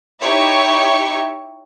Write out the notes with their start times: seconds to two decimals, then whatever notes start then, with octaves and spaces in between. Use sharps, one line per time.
0.22 D#4 E4 G4 C#5 E5 C#6